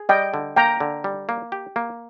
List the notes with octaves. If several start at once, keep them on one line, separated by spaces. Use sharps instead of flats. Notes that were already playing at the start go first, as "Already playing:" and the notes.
Already playing: G#4
G3 D#5 G5
D3
A#3 G5 A#5
D3
G3
A#3
G4
A#3